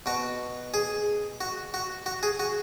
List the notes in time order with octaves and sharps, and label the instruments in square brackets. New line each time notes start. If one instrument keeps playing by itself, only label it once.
[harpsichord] B2 F#4
G#4
F#4
F#4
F#4
G#4
F#4